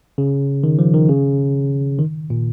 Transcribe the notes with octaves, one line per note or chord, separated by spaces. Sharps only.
C#3
D#3
F3
D#3
C#3
D#3
A#2